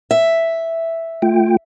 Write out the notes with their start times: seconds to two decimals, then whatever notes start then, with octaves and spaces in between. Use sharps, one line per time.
0.11 E5
1.22 A3 F4 G5